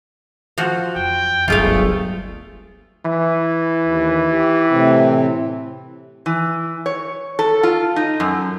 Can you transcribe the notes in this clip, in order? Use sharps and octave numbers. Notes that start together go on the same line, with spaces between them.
F3 F#4
F2 G5
D1 G1 A3 F4 G#4 F5
E3
D#2
G4
A2 C3 C4
E3
C#5
A4
F4
D#4
F#2